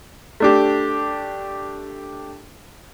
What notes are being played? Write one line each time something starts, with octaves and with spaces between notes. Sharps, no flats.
A3 D4 G4